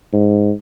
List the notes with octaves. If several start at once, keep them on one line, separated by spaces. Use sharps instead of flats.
G#2